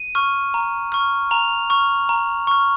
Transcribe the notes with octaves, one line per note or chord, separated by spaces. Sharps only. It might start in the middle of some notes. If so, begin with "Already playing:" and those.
Already playing: D#7
C#6 F6
A#5
C#6 F6
A#5 F7
C#6 F6
A#5
C#6 F6